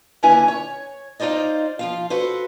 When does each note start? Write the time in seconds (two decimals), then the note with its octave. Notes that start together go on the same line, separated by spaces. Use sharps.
0.23 D#2 D3 C#4 E4 B4 G#5
0.48 C#5
1.19 D#4 F4 C5 D5 D#5
1.79 F3 F4 F5
2.10 F#4 A4 B4 C5